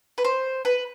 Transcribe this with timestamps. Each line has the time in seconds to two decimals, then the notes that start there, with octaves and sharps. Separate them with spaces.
0.18 B4
0.24 C5
0.65 B4